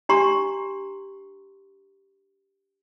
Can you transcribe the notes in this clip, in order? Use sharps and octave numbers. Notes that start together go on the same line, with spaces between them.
D4 G4 A#5 C6 C#6